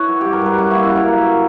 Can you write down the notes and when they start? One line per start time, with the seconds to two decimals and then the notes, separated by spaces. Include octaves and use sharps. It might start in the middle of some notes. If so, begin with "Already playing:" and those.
Already playing: E4 B4 C#5
0.08 F#3
0.21 G2 G4
0.33 A#4
0.41 G2 B4
0.58 F#2 F#4
0.71 A#3 E4
0.83 F#4
0.91 F#2 A#4
1.08 A#3